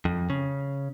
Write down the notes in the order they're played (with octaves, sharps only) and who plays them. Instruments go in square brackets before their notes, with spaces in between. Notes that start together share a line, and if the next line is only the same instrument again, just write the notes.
[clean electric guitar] F2
C#3